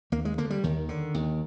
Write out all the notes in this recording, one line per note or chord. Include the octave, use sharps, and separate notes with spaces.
D#2 A#3
G#3
D3 A#3
G3
D#2 D#3
D3
D#2